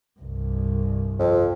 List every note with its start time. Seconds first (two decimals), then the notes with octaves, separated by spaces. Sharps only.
0.19 C2 G2
1.20 F2